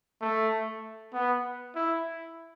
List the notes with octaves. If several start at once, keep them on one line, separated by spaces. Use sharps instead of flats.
A3
B3
E4